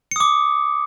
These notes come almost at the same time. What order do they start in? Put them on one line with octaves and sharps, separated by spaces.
C#7 D#6 D6